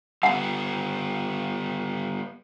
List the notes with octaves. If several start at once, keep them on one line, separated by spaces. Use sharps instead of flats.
G3 B3 F#5